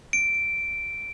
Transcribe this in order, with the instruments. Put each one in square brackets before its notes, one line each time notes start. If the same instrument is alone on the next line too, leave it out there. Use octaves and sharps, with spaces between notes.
[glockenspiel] D7